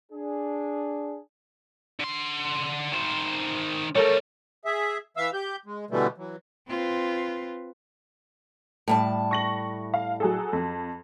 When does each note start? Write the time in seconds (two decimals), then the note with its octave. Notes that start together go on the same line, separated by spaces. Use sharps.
0.12 D4 G#4
2.00 D3 C6
2.93 D#3 C5
3.95 G3 A3 A4 A#4 C#5
4.65 G#4 E5
5.17 E3 E5 F5 E6
5.34 G4 G6
5.66 G#3
5.90 B2 D3 E3 G3 A3
6.18 E3 F#3
6.68 C4 F4 B4
8.88 A2 G3 A5
9.31 C#6 A#6 F#7
9.94 F5
10.20 F#3 G#4 A4
10.53 F2